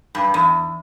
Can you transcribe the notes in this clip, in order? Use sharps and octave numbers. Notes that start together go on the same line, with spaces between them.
G2
E2